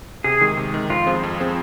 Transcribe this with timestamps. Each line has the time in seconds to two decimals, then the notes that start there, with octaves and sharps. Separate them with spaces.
0.24 C3 G#4
0.41 D#3 G#3
0.57 C3
0.74 D#3 G#3
0.90 F2 F4
1.06 F3 C4 G#4 C5
1.23 F2
1.40 F3 C4 G#4 C5